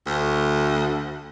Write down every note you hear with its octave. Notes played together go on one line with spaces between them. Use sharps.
D2